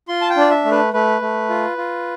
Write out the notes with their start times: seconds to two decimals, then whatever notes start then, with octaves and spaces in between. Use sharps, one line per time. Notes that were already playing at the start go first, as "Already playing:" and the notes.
0.08 F4 C6
0.21 A5
0.30 G5
0.36 D4 D5
0.51 E5
0.65 A3
0.71 B4
0.93 A3 B4
1.21 A3
1.49 F4
1.78 F4